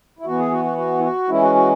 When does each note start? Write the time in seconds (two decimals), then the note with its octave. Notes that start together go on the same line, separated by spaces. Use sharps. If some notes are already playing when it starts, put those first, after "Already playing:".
0.19 E4
0.26 E3 B3 F#4
0.39 G#4
0.51 F#4
0.65 F#4
0.78 F#4
0.99 E4
1.03 F#4
1.29 E3 G#3 C#4 E4
1.42 F#4
1.55 F#4